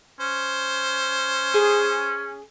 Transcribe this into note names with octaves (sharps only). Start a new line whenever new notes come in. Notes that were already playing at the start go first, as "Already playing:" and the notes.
C#4 C5
G#4